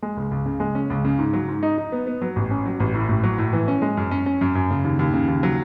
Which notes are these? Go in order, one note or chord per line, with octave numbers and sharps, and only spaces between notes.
G#3
C#2
C#2
C#3
G#3
C#4
C#2
C#3
G#2
F#3
G#2
D#4
D#4
B3
B3
F#3
A1
C#4
F#3
A1
A2
A1
F#3
A2
E3
C#4
G#3
F#2
C#4
C#4
F#2
F#2
C#3
D#2
D#2
C#3
D#2
F#3